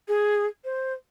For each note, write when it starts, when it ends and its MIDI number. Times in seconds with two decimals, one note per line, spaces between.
0.08 0.46 68
0.65 0.94 72